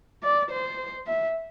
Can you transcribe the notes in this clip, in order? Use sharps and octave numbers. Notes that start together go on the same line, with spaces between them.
D5
C5
E5